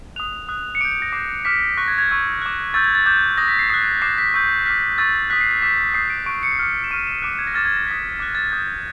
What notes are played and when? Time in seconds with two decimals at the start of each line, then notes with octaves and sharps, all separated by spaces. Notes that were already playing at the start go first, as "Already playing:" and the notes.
0.16 D#6 F#6 F7
0.48 D#6 F#6
0.75 C#7
0.81 D6 G6 D7
0.91 D7
1.02 A#6
1.12 D6 G6 C7
1.45 D6 F6 B6
1.77 C#6 F#6 A#6
1.88 G#6
1.98 G#6
2.09 C#6 E6 G6
2.42 D6 F#6
2.74 C#6 E6 G6 A6
2.84 G#6
2.95 A6
3.06 D6 G6
3.38 D#6 G6 A#6
3.48 B6
3.59 C7
3.70 D#6 F#6 C7
4.02 D6 F#6 C7
4.18 B6
4.34 C#6 E6 G6
4.66 D6 F6 B6
4.98 C#6 E6 G6 A6
5.30 D#6 F#6 B6
5.41 C7
5.51 C7
5.62 D6 G6 B6
5.94 D#6 G6 C7
6.10 D7
6.26 C#6 F#6 D7
6.43 C#7
6.51 C7
6.59 D6 F6 C#7
6.84 E7
6.91 C#6 F6 D#7
7.07 E7
7.22 D6 F#6 D7
7.39 G#6
7.47 A#6
7.54 D6 F6 A6
7.65 G#6
7.76 A#6
7.87 D#6 F#6 B6
8.19 D6 F#6 A#6
8.35 A6
8.51 D#6 G6